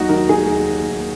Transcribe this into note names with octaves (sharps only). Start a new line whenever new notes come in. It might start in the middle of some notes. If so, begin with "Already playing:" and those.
Already playing: D#2 F#3 D#4 F#4
D#3 A#4
D#3 G#4
D#2
D#2
D#2